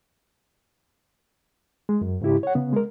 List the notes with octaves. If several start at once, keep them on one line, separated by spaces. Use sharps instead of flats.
G#3
F#2
G#2 C#3 E4 G4
C#5 F#5
C#3 B3
G#3 A#4